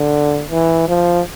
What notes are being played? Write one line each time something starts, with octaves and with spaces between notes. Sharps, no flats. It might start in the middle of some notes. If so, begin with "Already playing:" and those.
Already playing: D3
E3
F3